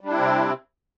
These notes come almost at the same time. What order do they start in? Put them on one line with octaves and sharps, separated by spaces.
G3 D4 E4 C4 C3